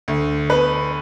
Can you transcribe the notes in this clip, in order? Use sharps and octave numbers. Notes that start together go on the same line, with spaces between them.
D2
B3 B4